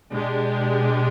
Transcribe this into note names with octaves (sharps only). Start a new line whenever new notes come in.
B2 G#3 D4 G4